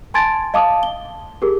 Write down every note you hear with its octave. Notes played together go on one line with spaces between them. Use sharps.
G#5 A5 C6 G#6 A6 D7
D#5 F5 A5 D6 D#6
G7
G4 G#4 A#4